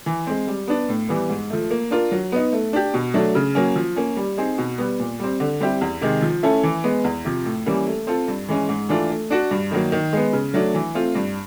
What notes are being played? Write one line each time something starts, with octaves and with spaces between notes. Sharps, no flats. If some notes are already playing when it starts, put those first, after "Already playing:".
E3
G#3 C4
G3
B3 D4
A2
E3 G3 B3
G#2
F3 A3
A#3
D4 F4 A#4
F#3
B3 D#4
A3
D4 G4
B2
F#3 A3 D4
C#3
F#3 A#3 C#4
F3
A#3 C#4
G3
C4 D#4 G#4
B2
G3 B3
A#2
G3 C4
D3
G3 C4 E4 G4
E2
C3 D#3 G#3
F3
A3 C#4 E4 A4
E3
G#3 B3
E2
C3 F3
A2
E3 G3 A#3 C#4
A3
C4 F4 A4
G2
E3 G#3 C#4
G#2
E3 A3 D4 F4
A3
D4 F#4
G2
D#3 F#3 A#3
D#3
G#3 B3
C#3
F#3 A3 D4
E3
A3 C4 F4
G2